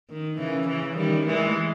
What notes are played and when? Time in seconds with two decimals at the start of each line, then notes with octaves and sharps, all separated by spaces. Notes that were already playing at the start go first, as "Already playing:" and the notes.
0.10 D#3
0.39 C#3 E3
0.68 C#3 E3
0.97 D#3 G3
1.26 E3 G#3